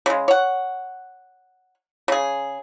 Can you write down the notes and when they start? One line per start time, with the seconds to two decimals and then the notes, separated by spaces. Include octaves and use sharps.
0.06 C#3 G#3
0.28 C#5 F#5
2.08 C#3 G#4